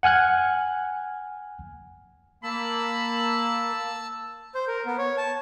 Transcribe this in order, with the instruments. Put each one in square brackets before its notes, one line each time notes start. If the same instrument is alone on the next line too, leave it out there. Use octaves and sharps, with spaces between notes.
[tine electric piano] F#5 G#5 F6 F#6 G#6
[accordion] A#3 [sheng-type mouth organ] A5 E6 [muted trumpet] B5
[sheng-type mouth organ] C5
A#4
B3
C#5
A5